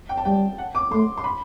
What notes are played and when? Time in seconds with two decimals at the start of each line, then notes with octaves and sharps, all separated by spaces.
0.09 G5
0.17 A5
0.25 G3 G5
0.58 F#5
0.75 D6
0.91 A3 C6
1.17 C6
1.24 B5